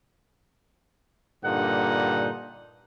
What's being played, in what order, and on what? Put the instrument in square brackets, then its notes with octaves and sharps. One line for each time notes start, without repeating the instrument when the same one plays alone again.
[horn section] G2 A#2 D3 D#4 F#5